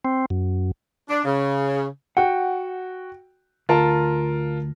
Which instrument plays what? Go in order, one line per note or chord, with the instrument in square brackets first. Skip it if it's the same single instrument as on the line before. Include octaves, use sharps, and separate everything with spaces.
[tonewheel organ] C4
F#2
[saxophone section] D4
C#3
[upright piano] F#4 G5 [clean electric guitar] F#5
[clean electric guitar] D2 [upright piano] F4 A#4 A5